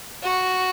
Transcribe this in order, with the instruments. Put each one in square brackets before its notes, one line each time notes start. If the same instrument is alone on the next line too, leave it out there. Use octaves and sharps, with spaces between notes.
[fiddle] F#4